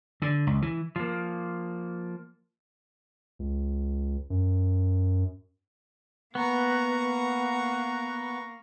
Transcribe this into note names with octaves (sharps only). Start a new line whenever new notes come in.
D3
C#2
E3
F3 A#3
C#2
F#2
A#3 B3 A#5 C#6